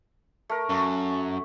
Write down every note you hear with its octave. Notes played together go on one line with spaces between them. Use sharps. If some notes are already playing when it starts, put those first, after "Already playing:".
A3 A#4
F#2 A3 C#6